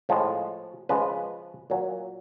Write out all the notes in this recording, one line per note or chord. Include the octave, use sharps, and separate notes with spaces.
A2 F3 G#3
C#3 F3 G#3 B4
A#2 F#3